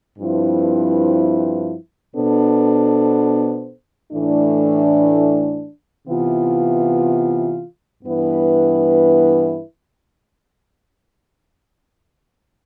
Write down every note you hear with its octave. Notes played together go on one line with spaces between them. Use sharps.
G2 F3 C4 E4 B4
B2 B3 D4 A4 C5
A2 E3 A3 D4
C3 E3 B3 F4
G2 E3 B3 E4 B4